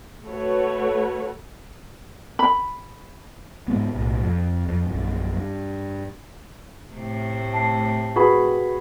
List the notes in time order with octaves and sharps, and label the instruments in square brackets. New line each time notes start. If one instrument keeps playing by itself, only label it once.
[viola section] A3 F#4 A4 B4 C#5
[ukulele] B5
[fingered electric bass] G#2 G#3 B3
B1 A2
F2
F2
A#1 F#2
G2
[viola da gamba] A2 C3 A3
[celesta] A5 C7
[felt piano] F#4 G#4 B5 [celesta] B4